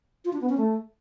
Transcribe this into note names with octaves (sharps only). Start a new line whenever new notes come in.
F4
D4
B3
C#4
A3